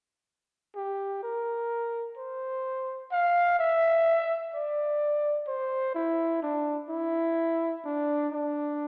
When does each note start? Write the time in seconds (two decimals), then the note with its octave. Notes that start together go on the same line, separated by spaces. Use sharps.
0.75 G4
1.23 A#4
2.18 C5
3.12 F5
3.59 E5
4.54 D5
5.48 C5
5.95 E4
6.43 D4
6.90 E4
7.85 D4
8.32 D4